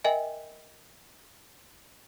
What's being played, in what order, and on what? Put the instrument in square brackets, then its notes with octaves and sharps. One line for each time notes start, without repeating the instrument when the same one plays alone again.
[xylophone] A#4 D#5 E5 G5 G#5